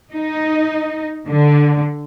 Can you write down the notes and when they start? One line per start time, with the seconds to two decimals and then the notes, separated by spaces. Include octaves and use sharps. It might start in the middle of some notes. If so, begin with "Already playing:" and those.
0.11 D#4
1.26 D3